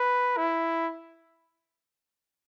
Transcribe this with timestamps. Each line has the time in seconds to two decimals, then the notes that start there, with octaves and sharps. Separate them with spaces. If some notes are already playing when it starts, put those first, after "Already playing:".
Already playing: B4
0.37 E4